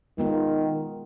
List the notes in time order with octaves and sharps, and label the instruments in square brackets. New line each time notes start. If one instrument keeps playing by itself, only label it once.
[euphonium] D#3 [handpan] G#3 B3 F4